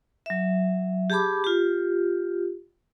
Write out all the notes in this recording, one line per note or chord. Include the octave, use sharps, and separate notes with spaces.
F#3 E5
G4 G#4 A5 B5 D6
F4 G4